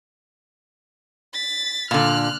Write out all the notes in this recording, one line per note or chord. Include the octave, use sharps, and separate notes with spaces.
A6 B6
A#2 D3 F6 F#6